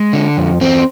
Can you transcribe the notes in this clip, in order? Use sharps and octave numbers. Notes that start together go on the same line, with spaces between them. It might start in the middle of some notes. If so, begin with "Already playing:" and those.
Already playing: G#3
D3
F2
E2 C4